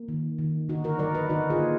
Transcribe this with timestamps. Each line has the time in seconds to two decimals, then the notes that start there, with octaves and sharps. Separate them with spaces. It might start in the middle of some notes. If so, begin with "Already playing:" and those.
Already playing: A#3
0.08 D#3
0.39 D#3
0.69 D3 D#4 F#4
0.84 F#4 A#4
0.99 F#3 A#4 D5
1.15 B4 D#5
1.29 D3 D#4 F#4
1.50 F4 G#4
1.60 A#3